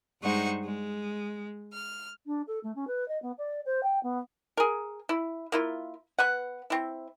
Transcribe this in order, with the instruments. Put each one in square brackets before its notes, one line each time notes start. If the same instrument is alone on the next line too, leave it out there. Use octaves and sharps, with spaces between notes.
[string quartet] G2 G#3 D#4 C5 F#5 C#6
G#3
F6
[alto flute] D4
A4
A3
C#4
B4
D#5
B3
D5
C5
G5
B3
[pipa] G#4 A#4
E4
A#3 E4 F4
B3 B4 F#5
C4 E4